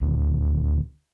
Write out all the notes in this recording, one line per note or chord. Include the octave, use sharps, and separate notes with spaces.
D#1 D2